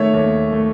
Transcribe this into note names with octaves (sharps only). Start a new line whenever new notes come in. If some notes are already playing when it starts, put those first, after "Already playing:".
Already playing: D#3 A3 C#5 E5
D#2
A3